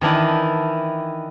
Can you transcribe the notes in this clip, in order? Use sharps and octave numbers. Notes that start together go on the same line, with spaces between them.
D#3 E3 D4 E4